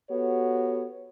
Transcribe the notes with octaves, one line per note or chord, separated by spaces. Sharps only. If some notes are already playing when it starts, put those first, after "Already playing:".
B3 F#4 G4 A4 C#5